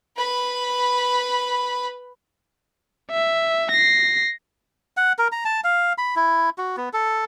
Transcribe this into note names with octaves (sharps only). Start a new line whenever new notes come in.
B4 B5
E5
A#6 C7
F#5
A#4
A#5
A5
F5
B5
E4
F#4
B3
A4